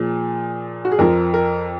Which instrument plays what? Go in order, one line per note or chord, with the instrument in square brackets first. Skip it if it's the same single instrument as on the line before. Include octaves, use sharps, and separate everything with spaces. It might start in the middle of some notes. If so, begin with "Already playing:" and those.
Already playing: [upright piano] A#2 F3 G#4
F#4
G#4
F2 F3 A#4
A#4